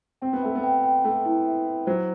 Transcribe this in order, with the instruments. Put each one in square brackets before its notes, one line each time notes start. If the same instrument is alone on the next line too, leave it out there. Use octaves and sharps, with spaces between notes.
[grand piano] C4 [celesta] G5
[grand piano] B3
[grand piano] A3 [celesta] E5
[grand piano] B3
[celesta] G5
G5
[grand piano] A3 [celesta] B4
[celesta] E4
E5
E4
[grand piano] F#3 [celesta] C5